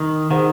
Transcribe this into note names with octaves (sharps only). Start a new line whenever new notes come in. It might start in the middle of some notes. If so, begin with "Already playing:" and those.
Already playing: D#3
D#3 G#4 C5 F#5